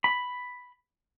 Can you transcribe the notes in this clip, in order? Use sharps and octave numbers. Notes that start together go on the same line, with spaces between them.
B5